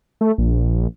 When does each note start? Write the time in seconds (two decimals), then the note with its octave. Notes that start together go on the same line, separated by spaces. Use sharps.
0.21 A3
0.38 A#1